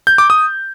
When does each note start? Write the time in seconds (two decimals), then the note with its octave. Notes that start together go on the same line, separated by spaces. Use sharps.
0.07 G6
0.18 D6
0.30 D#6